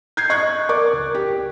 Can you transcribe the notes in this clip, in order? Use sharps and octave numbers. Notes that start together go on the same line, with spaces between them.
G6 G#6 C7
D#5 C#6 F#6 G#6
A#4 D5 C#6 D6
C#2
G4